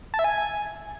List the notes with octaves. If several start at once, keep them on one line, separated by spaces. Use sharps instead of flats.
A5
E5
G#5